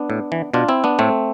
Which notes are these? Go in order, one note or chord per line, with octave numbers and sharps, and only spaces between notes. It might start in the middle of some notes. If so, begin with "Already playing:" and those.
Already playing: B3 D4
A2
E3
B2 D4 F4
C4 E4
B3 D4
A2 A3 C4